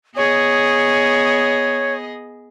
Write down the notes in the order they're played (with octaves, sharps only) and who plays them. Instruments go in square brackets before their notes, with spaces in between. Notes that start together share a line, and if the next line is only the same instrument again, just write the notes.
[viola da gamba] B3 G#4 D#5 [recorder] C#5